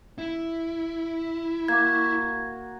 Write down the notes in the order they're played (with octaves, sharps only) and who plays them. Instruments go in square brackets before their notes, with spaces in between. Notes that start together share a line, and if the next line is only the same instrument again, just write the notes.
[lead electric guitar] E4
[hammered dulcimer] A#3 F#4 [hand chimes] G#6